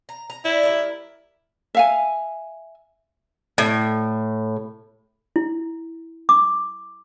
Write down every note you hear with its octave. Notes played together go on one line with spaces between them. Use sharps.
A#5
A#5
E4 D5
G3 A#4 E5
E5 F5 G#5
A2
E4
D6